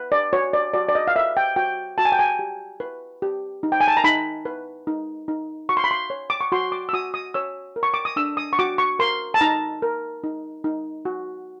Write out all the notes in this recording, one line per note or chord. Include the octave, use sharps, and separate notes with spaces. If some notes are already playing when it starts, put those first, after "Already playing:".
Already playing: B4
D5
F#4 C#5
D5
F#4 D5
D5
D#5
F5
B4 E5
G5
F#4 G5
F#4 A5
G#5
G5
G#5
G4
B4
G4
D#4
G5
G#5
A5
A#5
D#4 B5
B4
D#4
D#4
F#4 C#6
C6
B5
C6
C#5
D6
C#6
F#4 C6
D6
E6
F#4 D#6
D#6
C#5 E6
A#4
C#6
D6
D#6
D4 E6
D#6
C#6
F#4 D6
C#6
A#4 C6
A5
D#4 A#5
A#4
D#4
D#4
F#4